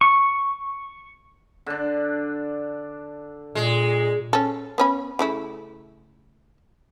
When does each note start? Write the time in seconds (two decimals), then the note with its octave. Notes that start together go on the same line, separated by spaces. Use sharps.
0.01 C#6
1.66 D3 D4
3.55 A#2 G#3
4.33 C#4 A4
4.78 B3 C#4 B5
5.19 C#3 A3 E4